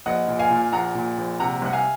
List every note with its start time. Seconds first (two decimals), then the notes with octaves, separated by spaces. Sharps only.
0.06 A#1 D#5 F#5
0.28 A#2
0.39 F5 G#5
0.51 A#2
0.72 A#1 F#5 A#5
0.95 A#2
1.18 A#1
1.40 C3 F#5 A#5
1.62 C2 F#5
1.73 F5 G#5